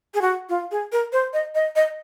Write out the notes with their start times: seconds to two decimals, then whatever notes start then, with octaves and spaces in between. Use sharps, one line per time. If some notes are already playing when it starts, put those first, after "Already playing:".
0.14 G#4
0.21 F#4
0.49 F4
0.71 G#4
0.92 A#4
1.13 C5
1.33 D#5
1.55 D#5
1.76 D#5